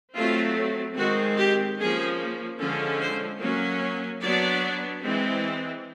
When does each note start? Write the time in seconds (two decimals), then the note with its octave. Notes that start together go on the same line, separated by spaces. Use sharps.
0.16 F#3 A3 C4 F4
0.97 D#3 G#3 C4 F#4
1.38 G4
1.79 F3 A#3 C#4 G#4
2.60 D3 F3 G#3 C#4 A4
3.01 C5
3.41 F#3 A#3 C#4
4.22 F#3 B3 D4 D5
5.03 E3 G#3 C4